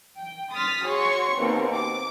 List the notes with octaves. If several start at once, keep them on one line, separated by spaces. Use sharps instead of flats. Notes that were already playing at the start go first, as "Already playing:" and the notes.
G5
C6 D#6 F6 A6 B6
F#4 G#4 C#5 C6 C#6
D#2 B2 C4
D6